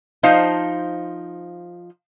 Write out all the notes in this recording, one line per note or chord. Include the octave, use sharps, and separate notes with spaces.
F3 D#4 C5 F5 A5